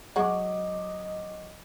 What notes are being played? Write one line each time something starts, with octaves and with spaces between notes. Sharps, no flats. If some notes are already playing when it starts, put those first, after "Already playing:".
F#3 G#3 F#4 D#5 D6